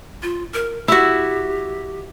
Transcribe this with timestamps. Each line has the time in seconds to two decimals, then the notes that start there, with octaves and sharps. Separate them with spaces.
0.23 F4
0.54 A#4
0.88 E4 F#4 G4